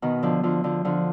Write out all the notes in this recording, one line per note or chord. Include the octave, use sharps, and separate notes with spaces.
B2 D#3
D3 F3
D3 F3
D3 F3
D3 F3